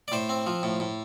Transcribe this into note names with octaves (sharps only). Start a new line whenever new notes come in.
D5
A2 C5
C4
F3
A2
A2